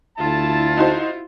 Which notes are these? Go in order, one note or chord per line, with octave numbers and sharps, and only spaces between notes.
D2 E4 F4 A5
D#4 F#4 C5